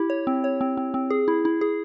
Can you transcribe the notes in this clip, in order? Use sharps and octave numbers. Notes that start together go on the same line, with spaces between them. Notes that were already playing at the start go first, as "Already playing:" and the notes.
Already playing: E4 G4
C#5
C4
C#5
C4
C4
C4
G#4
E4
E4
G#4